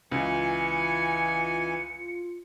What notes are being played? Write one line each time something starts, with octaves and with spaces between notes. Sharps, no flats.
C#2 E3 F4 G#5 C#7